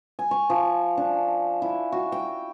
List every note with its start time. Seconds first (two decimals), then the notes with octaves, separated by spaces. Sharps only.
0.19 G#5
0.31 C#6
0.50 F3
0.97 D4
1.62 E4
1.92 F#4
2.12 G5